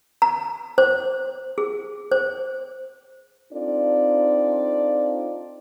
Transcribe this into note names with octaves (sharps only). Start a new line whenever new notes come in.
A#5
C5
G#4
C5
C4 D4 D#4 F4 A4 D5